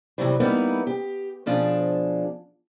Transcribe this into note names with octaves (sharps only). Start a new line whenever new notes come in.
C3 E3 F#3 G3
G3 A#3 B3 D#4 E4
G4
B2 F3 D4 G#4